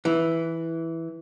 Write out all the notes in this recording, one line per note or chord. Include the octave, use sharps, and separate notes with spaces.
E3